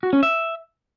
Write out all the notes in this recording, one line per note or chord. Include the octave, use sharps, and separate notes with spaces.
F#4
C#4
E5